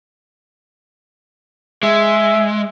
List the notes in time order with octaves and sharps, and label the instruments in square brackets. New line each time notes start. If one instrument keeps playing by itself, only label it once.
[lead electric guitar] G#3 [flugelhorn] E5